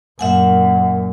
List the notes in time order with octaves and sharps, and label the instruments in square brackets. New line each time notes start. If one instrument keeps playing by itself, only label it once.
[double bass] F#2 A#2 [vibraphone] E5 F#5 G#5